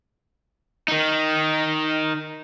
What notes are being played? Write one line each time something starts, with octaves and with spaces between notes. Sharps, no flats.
D#3 D#4